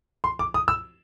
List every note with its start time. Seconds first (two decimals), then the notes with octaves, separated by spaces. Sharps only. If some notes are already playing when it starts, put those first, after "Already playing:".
0.24 C6
0.39 D6
0.54 D#6
0.68 E6